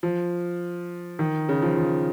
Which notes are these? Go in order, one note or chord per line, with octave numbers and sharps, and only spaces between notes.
F3
D#3
C#3
F3
F3